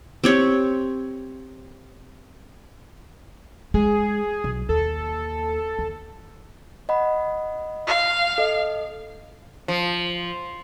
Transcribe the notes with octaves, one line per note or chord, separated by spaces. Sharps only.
C4 G4 C#5
G#3 G#4
B1
D#2 A4
D#2
D#5 F#5 B5
F5
A4 D#5
F3